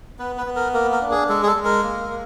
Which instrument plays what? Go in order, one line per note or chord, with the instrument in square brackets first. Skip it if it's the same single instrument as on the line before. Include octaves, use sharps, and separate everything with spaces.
[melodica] B3 B4
B4
B3
A#4
A#3 A#4
A#4
D4
G#4
G#3 A4
G#4
A4
G#3
A#4
A#3
A#3